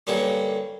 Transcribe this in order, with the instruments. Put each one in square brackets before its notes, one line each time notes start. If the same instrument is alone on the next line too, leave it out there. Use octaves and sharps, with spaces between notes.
[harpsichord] G2 D3 G3 A#3 C#4